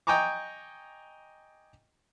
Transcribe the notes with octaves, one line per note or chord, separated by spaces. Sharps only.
D#5 G5 G#5 A#5 C#6 D6